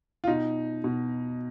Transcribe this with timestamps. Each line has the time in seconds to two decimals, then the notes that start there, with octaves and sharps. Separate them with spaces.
0.24 F4
0.27 B2 D#4
0.84 B2